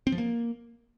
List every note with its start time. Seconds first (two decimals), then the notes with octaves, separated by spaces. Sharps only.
0.07 C4
0.12 F3
0.18 A#3